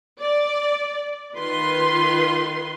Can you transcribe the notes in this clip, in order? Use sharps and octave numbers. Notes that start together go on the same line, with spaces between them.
D5
D#3 F4 B4 C6